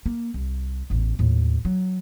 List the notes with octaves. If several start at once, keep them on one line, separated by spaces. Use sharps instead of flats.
A#3
C2
A1 E2
D#2 A2
F#3